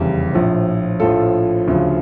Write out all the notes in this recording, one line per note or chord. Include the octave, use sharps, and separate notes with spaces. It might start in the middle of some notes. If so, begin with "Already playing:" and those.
Already playing: F1 E2 C#3 G3
A#1 A2 F3
A#1 A2 F3 F4 A4
D2 C#3 F3